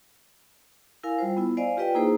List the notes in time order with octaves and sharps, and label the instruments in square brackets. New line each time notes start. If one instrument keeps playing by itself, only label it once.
[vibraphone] E4 A#4 F5 G#5
G3 F4 C5
B3 E4
C5 D5 D#5 F5 G#5
F4 G4 B4 D#5 G5
A#3 D#4 E4 G#4 C5